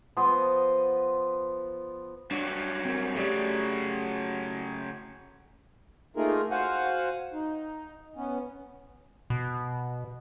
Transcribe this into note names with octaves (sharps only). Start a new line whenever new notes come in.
F3 B3 D#5 C6
G2 F#3 D4
C4 A#4
C#3 F#3 A3 G4 D5
A3 A#3 D#4 F4 G#4 A#4
F#4 C5 F5 F#5 G#5
D#4
B3 C#4
B2